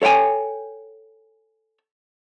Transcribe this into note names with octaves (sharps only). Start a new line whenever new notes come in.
A4 C#5 F5 G5 G#5